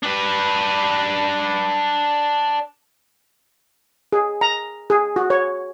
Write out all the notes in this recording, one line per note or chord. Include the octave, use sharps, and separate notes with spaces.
D4 B4
G#4
A#5
G#4
F#4
C#5